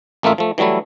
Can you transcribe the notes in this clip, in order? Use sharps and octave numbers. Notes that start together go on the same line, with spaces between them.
A1 A3 A#3 F4 E5
F3 A3
E3 F#3 G3 A3 E4